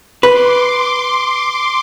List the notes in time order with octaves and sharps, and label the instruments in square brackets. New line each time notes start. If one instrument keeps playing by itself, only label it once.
[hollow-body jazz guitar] B4 [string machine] C6 D6